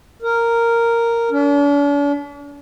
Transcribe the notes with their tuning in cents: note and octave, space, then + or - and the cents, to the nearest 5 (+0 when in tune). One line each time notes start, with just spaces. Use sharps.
A#4 -5
D4 -45